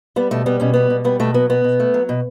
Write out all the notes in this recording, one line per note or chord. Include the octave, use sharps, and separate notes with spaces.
G3 B3
B2 A3
G3 B3
B2 C#4
G3 B3
B2
G3 B3
B2 A3
F#3 B3
B2 B3
B2
A3
F#3
B2